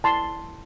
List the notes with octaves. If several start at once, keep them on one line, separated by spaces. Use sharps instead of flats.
E4 A5 C6